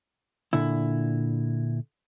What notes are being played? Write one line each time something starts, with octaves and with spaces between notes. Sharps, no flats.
A#2 D3 E4